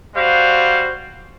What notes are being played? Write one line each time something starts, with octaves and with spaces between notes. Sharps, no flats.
G3 F#4 C5 F5